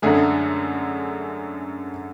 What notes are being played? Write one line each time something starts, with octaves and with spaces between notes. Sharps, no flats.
F#2 D3 G#3 A3 G#4